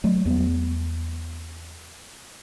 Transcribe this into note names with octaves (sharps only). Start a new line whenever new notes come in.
F#3 G3 A3
E2 B3